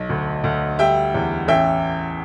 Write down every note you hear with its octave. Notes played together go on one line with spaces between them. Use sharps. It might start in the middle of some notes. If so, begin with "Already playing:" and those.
Already playing: B1
D2
D2
G3 E5 G5
E2
A1 E5 G5